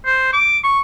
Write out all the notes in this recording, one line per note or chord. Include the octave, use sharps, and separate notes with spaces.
C5
D6
C#6